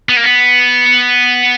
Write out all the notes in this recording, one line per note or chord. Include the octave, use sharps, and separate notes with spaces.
B3
A#3
B3